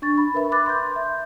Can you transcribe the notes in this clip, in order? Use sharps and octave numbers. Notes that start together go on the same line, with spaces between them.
D4 C#6 A6
B5
A#4 B4 E5 B5
D6 F#6 A6
C6 G6
E5